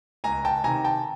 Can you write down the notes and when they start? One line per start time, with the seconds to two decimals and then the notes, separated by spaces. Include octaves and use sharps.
0.24 C#2 G#5 A#5
0.45 G5 A5
0.64 C3 D#3 G#5 A#5
0.84 G5 A5